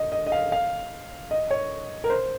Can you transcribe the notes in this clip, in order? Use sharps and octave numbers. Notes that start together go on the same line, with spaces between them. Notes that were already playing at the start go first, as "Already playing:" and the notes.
Already playing: D#5
D#5
D#5
F5
F5
D#5
C#5
A#4
C5